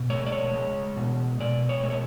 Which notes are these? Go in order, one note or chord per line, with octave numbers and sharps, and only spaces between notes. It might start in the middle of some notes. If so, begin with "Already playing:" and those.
Already playing: B2
G#3 C#5
D5
C#5
G#3
B2
B2 D5
C#5
G#3
C#5